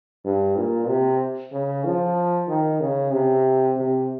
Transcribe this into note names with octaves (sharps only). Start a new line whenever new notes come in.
G2
A#2
C3
C#3
F3
D#3
C#3
C3
C3